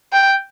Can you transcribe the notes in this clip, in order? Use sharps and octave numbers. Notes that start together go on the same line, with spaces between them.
G5